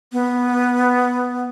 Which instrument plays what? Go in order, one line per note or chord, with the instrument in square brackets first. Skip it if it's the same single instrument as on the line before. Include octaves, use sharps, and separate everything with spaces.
[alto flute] B3